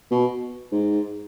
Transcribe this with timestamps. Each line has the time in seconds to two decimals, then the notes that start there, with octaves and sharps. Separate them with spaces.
0.11 B2
0.72 G#2